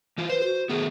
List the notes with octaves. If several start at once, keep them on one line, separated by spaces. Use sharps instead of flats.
E3 F4
B4 C5
F#4
D#3 A3 B3 G#4